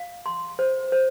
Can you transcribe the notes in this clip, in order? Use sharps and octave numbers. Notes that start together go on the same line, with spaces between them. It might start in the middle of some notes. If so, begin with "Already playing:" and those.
Already playing: F5
C6
C5
C5